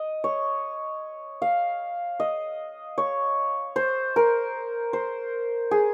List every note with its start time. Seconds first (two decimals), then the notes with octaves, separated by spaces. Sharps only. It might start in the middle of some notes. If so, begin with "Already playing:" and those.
Already playing: D#5
0.24 C#5
1.42 F5
2.20 D#5
2.98 C#5
3.76 C5
4.16 A#4
4.93 C5
5.71 G#4